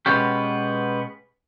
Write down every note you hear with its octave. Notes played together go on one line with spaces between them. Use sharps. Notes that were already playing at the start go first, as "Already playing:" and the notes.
B2 F3 G#3 B3 C#4 G4